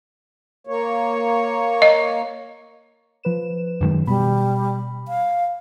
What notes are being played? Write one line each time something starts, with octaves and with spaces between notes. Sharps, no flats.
A#3 C#5
D#5
F3 B4 E7
F#2 D#3 G#3
B2 G3 B5
F5